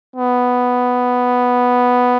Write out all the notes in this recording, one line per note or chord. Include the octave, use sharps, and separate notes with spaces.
B3